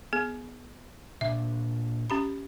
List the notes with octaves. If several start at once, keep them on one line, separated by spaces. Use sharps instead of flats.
B3 G#4
A#2 D4 E5
C#4 G4 B5